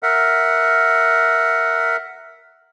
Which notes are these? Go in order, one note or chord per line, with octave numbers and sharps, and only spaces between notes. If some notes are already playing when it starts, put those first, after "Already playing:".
A#4 E5 F#5